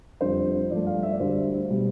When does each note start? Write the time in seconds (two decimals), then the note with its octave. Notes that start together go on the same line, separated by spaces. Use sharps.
0.21 F2 D3 G3 C5
0.70 G2 F3 A3 D5
0.87 F5
1.03 E5
1.13 D5
1.20 D2 D3 G3 C5
1.70 B2 G3